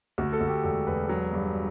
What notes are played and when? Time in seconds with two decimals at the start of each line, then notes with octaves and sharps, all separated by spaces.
0.18 D2 F#4
0.33 A4
0.40 D2
0.48 G4
0.64 E1 A4
0.87 E1 B4
1.09 F#3
1.33 G2